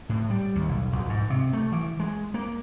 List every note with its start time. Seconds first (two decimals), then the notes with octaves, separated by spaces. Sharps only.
0.09 A2
0.30 G3
0.55 D#2
0.69 B1
0.93 A#1
1.09 G#2
1.30 C3
1.53 A3
1.72 E3
1.99 G#3
2.34 A#3